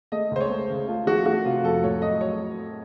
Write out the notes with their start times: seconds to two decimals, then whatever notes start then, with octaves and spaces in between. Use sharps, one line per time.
0.12 A3 D#5
0.31 C#2 C5
0.40 C#5
0.50 A3
0.70 C#3
0.88 A3 F4
1.07 F3 F#4
1.26 A3 F#4
1.45 C3 F4
1.64 F2 A4
1.83 A2 C#5
2.02 F#3 D#5
2.21 F#3 C#5